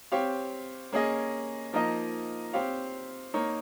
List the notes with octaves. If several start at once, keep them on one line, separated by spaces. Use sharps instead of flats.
C4 G4 C#5 F5
A#3 C#4 G#4 D#5
F3 A#3 D#4 A#4 D#5
C4 G4 C#5 F5
A#3 D#4 A#4 C#5